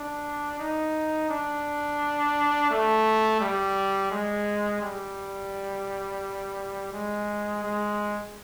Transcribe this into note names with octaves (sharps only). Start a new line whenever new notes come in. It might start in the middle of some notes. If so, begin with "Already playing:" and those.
Already playing: D4
D#4
D4
A3
G3
G#3
G3
G#3
G#3